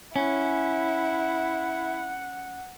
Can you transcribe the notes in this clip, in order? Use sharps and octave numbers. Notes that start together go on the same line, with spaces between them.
C#4 E4 F#5